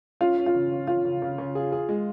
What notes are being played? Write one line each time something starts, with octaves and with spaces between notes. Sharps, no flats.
C#4 F4
C#4
F4
C#3
C#4
C#4 F4
C#3
C#3
C#3
G#4
G#4
G#3